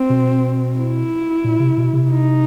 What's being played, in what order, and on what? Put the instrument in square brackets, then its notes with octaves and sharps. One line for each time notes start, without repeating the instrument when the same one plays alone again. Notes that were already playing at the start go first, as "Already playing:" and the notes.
Already playing: [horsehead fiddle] C4
[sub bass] B2
[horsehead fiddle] E4
[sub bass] A#2
C3
B2
C3
[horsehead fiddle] D#4